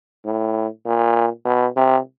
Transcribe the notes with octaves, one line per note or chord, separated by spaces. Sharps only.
A2
A#2
B2
C3